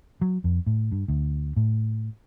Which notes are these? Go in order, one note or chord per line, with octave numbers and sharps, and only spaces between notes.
F#3
F2
A2
G2
D2
A2